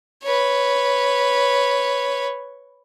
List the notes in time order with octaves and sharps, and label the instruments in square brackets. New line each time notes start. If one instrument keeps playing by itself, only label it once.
[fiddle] B4 C#5